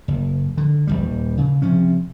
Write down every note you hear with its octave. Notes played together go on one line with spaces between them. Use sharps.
F#1
D3
D#1 A#1 G3
C#3
C3 F3 C#4